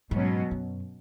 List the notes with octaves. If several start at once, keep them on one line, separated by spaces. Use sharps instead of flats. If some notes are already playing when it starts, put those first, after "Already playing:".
G#2 B2 F#3 C#4
F#2